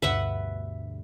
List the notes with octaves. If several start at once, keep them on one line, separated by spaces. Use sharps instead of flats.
D2 G2 B2 B4 E5 F#5